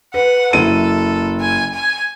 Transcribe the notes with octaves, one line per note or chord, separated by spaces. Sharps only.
B4 F#5
F#1 E4 A4 D#7
G#5
G#5